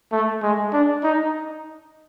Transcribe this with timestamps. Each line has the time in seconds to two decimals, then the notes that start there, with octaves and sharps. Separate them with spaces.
0.12 A3
0.42 G#3
0.73 D4
1.03 D#4